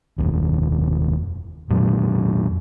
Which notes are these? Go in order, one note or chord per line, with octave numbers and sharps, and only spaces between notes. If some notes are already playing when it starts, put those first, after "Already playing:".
F1 D#2
F2 A#2 F#3